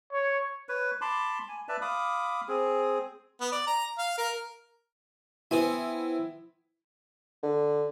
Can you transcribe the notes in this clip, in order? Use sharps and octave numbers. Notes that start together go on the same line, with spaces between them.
C#5
B4 C#5
A5 B5 C6 D6
G#5
B4 D5 E5 A5
F5 B5 D6 D#6
C4 G#4
B3
D5
A#5
F5
A#4
B3 C4 E4 G#5
D3